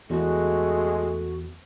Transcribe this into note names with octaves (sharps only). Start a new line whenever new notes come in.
E2 G#3 A3 F#4